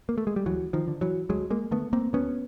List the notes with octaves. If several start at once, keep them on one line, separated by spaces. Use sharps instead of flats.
A#3
A3
G#3
G3
D2 E3 F#3
D#3 F3
D3
E3 F#3
D2 F#3 G#3
G#3 A#3
D3 A3 B3
A#3 C4
D2 B3 C#4